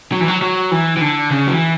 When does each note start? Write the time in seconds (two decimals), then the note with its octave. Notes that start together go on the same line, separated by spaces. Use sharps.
0.12 F#3
0.21 E3
0.28 F#3
0.42 F#3
0.71 E3
0.97 E3
1.01 D3
1.31 C#3
1.47 F#3
1.52 E3